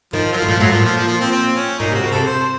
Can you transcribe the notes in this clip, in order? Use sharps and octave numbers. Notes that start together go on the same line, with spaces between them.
D#3 F3
F#3
F3
A2
A#2 F3
A2 F#3
A#2 F3
F3
F3
F3
C4
C4
C#4
A#2 D#4
C3
F#4
C#3
C3 A4
C5